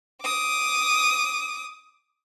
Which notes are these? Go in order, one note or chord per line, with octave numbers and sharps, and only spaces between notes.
D6 D#6